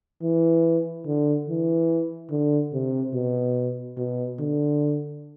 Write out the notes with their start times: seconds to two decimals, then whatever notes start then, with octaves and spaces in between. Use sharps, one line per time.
0.23 E3
1.06 D3
1.49 E3
2.31 D3
2.73 C3
3.14 B2
3.97 B2
4.39 D3